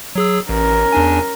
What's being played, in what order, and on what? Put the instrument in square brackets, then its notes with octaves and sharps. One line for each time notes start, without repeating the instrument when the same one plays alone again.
[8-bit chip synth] F#3 G#4 E6
[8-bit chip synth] A1 [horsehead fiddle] C#4 A#4
[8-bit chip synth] E2 D4 G#5